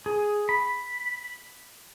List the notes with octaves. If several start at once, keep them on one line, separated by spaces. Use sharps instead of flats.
G#4
B5